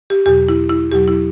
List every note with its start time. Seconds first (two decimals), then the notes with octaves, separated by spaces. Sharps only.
0.10 G4
0.26 E2 B2 F#3 G4
0.49 E4
0.69 E4
0.92 E2 B2 F#3 G4
1.08 E4